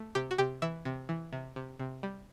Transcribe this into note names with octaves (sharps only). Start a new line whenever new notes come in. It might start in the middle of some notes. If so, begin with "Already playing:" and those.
Already playing: A3
C3 G4
F#4
C3 G4
E3 E5
C3
E3
C3
C3
C3
G3